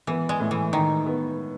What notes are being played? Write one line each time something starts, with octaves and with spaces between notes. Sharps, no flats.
E3 B3
G#3
A2
E3
D#3 D#4
B3